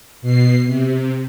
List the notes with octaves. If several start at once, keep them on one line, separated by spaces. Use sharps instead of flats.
B2 C7
C3